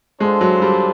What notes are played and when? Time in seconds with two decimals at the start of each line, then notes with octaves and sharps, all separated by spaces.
0.20 G#3 D4 F4 A4 C5
0.41 F#3
0.62 G3